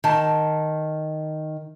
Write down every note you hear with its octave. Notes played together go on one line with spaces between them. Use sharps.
D#3 A5